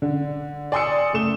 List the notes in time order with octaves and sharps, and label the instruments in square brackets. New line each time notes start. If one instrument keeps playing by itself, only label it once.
[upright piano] D3
D5 G#5 C6 D#6 E6 C#7
F#1 A3 E7 G7